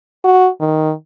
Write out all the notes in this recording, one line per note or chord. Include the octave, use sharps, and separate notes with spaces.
F#4
D#3